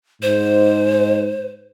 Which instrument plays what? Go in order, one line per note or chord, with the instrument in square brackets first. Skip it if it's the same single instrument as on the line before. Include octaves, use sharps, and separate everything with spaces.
[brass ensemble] G#2 [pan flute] C5